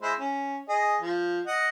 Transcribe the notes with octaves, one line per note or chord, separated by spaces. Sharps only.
G#3 E4 C5
C#4
G#4 D#5
F3
D#5 F#5